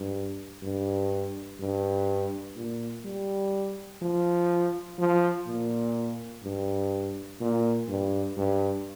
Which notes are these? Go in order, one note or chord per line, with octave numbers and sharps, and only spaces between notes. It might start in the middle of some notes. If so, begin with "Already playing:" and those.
Already playing: G2
G2
G2
A#2
G3
F3
F3
A#2
G2
A#2
G2
G2